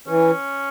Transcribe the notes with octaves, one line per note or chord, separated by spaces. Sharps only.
E3 C#4